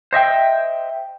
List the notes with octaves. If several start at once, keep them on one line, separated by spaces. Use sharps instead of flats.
C5 D#5 E5 G5